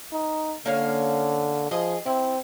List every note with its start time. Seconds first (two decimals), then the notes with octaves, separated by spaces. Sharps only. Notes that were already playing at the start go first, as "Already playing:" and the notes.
0.13 D#4
0.66 D3 A#3 C#4 F5
1.71 F3 G#4 D#5
2.06 C4 E4